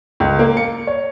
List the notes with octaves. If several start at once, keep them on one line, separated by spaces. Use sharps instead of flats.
C#2
A#3
C#7
C#5